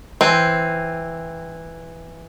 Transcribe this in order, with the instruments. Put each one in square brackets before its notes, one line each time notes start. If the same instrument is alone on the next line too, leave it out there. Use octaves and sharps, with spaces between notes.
[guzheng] E3 [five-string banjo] C4